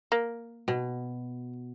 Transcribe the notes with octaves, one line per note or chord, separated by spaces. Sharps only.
A#3
B2